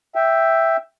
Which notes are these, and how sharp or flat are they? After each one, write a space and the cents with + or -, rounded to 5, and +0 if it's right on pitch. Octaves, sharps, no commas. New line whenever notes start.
E5 +0 G5 +0